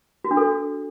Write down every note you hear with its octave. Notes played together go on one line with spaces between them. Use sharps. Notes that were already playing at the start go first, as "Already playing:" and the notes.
F#4
D4
A4